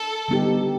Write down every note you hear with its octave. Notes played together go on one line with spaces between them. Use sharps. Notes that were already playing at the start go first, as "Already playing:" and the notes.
Already playing: A4
D3 G3 B3 D#4 G4